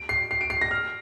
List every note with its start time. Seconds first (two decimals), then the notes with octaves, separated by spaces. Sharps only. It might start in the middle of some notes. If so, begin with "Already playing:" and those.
Already playing: D7
0.09 C7
0.31 C7
0.41 D7
0.50 C7
0.61 A#6
0.71 F6